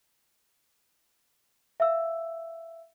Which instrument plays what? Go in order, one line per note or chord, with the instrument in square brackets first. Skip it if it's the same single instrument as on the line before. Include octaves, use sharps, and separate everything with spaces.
[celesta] E5 F5 E6